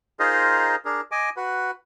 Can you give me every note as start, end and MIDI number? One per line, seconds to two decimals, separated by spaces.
0.20 0.76 63
0.20 0.76 65
0.20 0.76 68
0.20 0.76 70
0.20 0.76 72
0.20 0.76 75
0.85 1.01 62
0.85 1.01 68
0.85 1.01 70
1.11 1.30 75
1.11 1.30 80
1.11 1.30 86
1.37 1.71 66
1.37 1.71 71